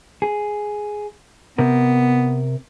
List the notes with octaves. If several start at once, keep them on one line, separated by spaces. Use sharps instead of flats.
G#4
C3 B3 A#4